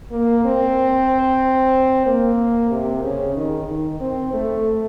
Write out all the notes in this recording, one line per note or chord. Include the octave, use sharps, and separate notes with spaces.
A#3
C4
A#3
C3
C#3
D#3
D#3
C4
A3